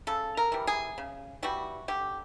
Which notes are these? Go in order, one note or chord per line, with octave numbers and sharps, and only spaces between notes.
C#3 A4
A#4
E3 G3
G#4
C#3
E3 G3 F#4
D3 G4